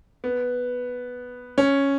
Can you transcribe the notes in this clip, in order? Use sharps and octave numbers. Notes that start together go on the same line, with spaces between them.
B3
C#4